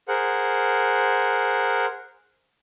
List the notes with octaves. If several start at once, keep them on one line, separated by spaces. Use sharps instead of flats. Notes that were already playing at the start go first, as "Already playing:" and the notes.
G#4 A#4 C5 F#5